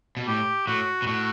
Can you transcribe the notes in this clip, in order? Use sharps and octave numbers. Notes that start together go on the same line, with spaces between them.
B2
A2 G4
A2 F#4
B2
A2 F#4